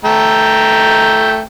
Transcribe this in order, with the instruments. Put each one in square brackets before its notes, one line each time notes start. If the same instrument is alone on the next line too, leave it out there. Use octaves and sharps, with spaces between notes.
[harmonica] A3 G5 A#5